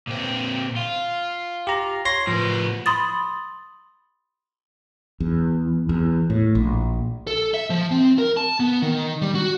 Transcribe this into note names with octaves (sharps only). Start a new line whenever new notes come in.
A#2 C4
F4
G4 A#5
C#5 C6 A#6
A2 F3 B3
B5 C6 D#6 A6
E2
E2
A2
A#1
A4
E5
F3
C4
A#4
A5
B3
D#3
G3
F#4